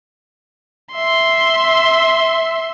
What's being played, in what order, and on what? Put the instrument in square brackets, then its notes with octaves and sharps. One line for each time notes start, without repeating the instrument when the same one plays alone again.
[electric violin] E5 C6